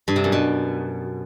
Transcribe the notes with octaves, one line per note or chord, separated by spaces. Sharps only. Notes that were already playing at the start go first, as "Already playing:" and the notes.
G2
C3
F#2
B2